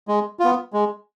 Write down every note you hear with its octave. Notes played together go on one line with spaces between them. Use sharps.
G#3
B3 F4
G#3